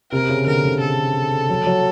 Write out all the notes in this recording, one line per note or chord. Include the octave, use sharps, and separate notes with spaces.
C3 A#4
C#3
D3 A#4
D3
A4
F#3
F#3